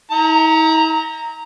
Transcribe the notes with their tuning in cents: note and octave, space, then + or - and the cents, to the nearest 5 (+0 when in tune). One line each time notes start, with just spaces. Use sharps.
E4 -45 A#5 -5